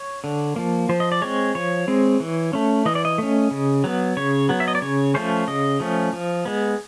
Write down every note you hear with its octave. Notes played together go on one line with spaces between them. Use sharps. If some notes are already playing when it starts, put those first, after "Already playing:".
Already playing: C#5
D3
F3 A#3
F3 C5
D#5
D5
G#3 C4 C#5
F3 C#5
G#3 C4
E3
A3 C#4
E3 D#5
D5
D#5
A3 C#4
C#3
F#3 B3
C#3 C#5
F#3 B3
E5
D#5
D5
C#3 C#5
F3 A3 C#4 C5
C#3 D#5
F3 A3 C#4
F3
G#3 B3